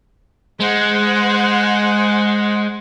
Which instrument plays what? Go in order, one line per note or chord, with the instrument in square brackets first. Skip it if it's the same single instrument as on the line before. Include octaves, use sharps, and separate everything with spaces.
[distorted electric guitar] G#3 [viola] C5 F#5